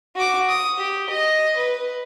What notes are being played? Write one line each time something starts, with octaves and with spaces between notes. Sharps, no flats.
F#4 D6
D#6
G4
D#5
B4